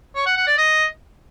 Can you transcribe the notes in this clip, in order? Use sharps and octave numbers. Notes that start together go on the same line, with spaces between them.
C#5
F#5
F#5
D5
D#5